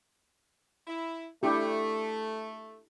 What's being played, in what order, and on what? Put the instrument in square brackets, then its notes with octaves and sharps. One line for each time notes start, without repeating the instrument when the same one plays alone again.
[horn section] E4
[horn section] A3 [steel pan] D4 E4 G4